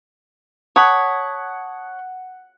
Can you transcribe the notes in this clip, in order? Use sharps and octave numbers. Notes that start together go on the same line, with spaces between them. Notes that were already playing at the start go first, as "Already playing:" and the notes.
C#5 F#5 A5 B5 D#6 G#6